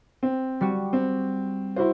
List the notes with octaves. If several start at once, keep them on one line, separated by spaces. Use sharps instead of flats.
C4
G3 F#4
C4
E4 F#4 C5